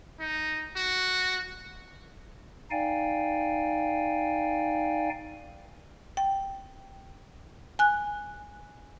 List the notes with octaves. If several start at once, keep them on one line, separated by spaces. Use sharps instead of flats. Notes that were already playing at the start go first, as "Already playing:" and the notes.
D#4
F#4
D#4 D5 F5 G5 G#5
G5
G#5 F#6